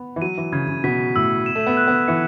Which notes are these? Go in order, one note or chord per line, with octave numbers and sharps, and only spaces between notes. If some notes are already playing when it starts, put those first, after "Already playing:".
Already playing: B3
E3
F#3 D#7
E3
C#3 G#6
C#3
B2 B6
A2 E6
E7
A3
B3
F#6
B3
E3 C#7